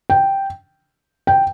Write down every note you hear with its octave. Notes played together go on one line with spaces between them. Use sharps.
G5
G5